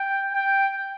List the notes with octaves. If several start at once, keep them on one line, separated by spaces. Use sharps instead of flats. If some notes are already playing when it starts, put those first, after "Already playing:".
Already playing: G5
G5